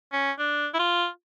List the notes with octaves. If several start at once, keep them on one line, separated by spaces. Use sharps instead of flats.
C#4
D4
E4
F4